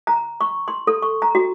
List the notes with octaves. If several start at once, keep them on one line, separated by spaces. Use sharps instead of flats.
A#5
C#6
C6
A4
C#6
A#5
F#4